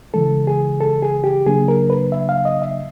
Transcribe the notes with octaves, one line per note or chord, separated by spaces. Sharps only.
C#3 E3 G#3 A4
G#4
A4
G#4
G4
C#3 F#3 A#3 D4 G#4
A#4
B4
E5
F5
D#5
E5